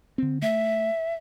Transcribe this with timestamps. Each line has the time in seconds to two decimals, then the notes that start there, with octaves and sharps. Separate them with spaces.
0.18 D3 C4
0.42 A3 E5